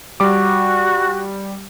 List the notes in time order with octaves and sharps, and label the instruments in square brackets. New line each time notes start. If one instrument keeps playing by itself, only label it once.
[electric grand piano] G3 D6 [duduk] F#4